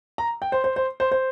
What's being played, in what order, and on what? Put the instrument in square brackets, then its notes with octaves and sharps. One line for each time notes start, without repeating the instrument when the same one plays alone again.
[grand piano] A#5
G5
C5
C5
C5
C5
C5